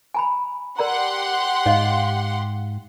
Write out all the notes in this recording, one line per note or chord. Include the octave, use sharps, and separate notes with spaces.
G#5 A#5 B5
G4 A#4 D5 F#5 A#5 C6
G#2 C#5 D#5 F5